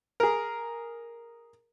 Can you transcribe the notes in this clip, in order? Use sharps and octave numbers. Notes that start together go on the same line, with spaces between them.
G#4 A#4